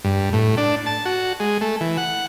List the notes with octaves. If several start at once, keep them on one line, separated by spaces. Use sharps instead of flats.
G2
A2
D4
A5
F#4
G#3
A3
E3
F#5